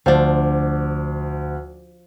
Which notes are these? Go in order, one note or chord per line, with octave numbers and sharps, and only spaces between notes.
D2 F3 D4